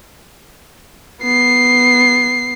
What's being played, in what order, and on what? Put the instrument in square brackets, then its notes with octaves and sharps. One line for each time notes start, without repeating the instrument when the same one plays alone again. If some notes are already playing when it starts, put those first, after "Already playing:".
[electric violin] B3 C7